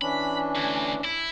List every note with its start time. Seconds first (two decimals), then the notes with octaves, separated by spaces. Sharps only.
0.02 E3 C#4 D4 B5
0.55 D2
1.04 E4